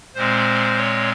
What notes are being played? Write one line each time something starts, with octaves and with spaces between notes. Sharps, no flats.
A#2 G#3 C4 C5
C#5